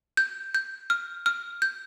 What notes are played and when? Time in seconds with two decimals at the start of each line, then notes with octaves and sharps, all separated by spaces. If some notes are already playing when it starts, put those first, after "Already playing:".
0.17 G6
0.55 G6
0.90 F6
1.26 F6
1.62 G6